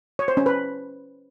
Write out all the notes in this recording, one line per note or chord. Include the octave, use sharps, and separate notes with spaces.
C#5
C5
C#4
B4